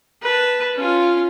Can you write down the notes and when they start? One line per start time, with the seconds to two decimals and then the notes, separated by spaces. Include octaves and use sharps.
0.22 B4 A5
0.76 C#4 F4